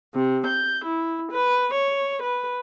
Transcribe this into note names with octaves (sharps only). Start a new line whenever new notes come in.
C3
G6
E4
B4
C#5
B4